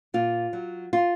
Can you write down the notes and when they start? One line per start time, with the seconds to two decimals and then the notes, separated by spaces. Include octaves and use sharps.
0.14 A#2 F4
0.53 F#3
0.93 F4